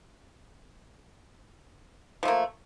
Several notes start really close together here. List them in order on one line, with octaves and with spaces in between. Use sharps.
F3 A3 A#3